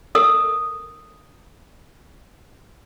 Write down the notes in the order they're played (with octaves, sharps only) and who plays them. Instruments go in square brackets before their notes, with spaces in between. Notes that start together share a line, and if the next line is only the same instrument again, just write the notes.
[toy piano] A4 A#4 D#6